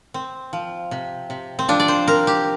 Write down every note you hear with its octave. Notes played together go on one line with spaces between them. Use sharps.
C4
F3
C3
C3
C4
F3 D4
D5
C5
C4 A#4
G4